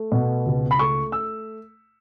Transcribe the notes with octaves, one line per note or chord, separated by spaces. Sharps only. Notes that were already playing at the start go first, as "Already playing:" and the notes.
Already playing: A3
B2
C#2
B5
A3 C#6
E6